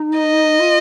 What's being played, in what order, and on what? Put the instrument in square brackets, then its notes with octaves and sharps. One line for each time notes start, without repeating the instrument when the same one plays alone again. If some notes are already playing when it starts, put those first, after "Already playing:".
Already playing: [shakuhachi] D#4
[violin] D#5
[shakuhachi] F4